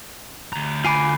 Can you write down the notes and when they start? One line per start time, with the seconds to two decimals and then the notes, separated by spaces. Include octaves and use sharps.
0.53 D2 A#5
0.85 F4 G#5 B5 D6 C7